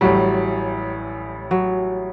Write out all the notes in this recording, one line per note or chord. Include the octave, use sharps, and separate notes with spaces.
A1 A2 F#3 G3
F#3